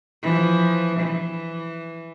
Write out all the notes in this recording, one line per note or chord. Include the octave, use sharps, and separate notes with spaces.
E3 F3
E3